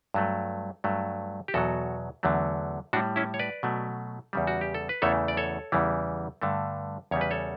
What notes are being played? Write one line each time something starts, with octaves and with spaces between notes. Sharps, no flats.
G2 F#3 A3
G2 F#3 A3
G4
E2 B2 F#3 F#4 A4
E2 D3 F#3 A3
A2 G3 D4 F#4
C#4 E4
C#5
B4 D5
B2 F#3 A3
E2 C#3 G3
F#4
G4
A4
B4
E2 C#3 E3 A3 A4 C#5
D5
A4 C#5
E2 C#3 E3 G3
G2 D3 A3
E2 C#3 G3 C#5
B4
A4 C#5